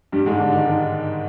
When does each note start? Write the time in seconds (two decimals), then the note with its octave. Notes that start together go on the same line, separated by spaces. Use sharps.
0.12 G2 G3
0.26 G#2 G#3
0.39 D3 D4
0.52 D#3 D#4
0.65 D#3 D#4